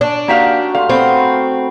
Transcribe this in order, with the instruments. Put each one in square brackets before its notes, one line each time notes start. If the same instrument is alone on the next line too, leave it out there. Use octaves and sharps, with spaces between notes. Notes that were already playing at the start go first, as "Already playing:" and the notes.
[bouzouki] D4 [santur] C#5 G#5 A5
[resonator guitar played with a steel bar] A#3 G4 F5 [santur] D#4 F#4
[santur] A3 G4 C6 [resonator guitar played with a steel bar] F5
[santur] A3 B3 F#4 [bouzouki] C4